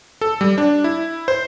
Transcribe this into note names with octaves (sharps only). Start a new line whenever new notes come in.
A4
G3
D4
E4
C5